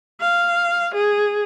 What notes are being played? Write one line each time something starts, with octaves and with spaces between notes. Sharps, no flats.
F5
G#4